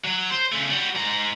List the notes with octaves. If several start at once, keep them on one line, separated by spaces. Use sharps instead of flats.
F#3
C5
C#3 A3
G3 F#4
G#2 A#5